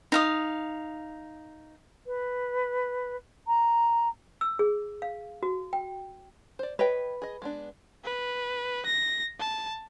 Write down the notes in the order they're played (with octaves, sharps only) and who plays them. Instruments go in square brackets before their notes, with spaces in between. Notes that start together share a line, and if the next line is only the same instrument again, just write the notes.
[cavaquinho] D#4 F5 D#6
[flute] B4
A#5
[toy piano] E6
G#4
F5
F#4
G5
[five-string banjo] C5 D5
[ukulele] B4 [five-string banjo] C#5 D#5 G5
[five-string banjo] G#4 D#5
G#3 B3 D4
[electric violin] B4
A#6
A5